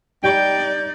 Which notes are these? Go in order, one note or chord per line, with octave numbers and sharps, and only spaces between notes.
G3 D#4 D5 G5 G6